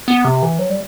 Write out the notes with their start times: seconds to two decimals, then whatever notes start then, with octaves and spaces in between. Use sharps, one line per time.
0.08 B3
0.25 C3
0.43 E3
0.59 F#3
0.69 G3